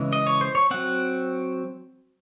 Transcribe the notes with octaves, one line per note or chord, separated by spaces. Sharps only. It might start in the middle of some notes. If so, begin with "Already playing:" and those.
Already playing: C#3 E3 G#3
D#5
C#5
C5
C#5
F#3 C4 F#5